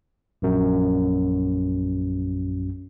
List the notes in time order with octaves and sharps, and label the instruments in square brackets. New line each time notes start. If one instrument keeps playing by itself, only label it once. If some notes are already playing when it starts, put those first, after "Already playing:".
[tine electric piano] A#1 F#2